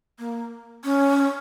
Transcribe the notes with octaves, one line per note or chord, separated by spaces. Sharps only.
A#3
C#4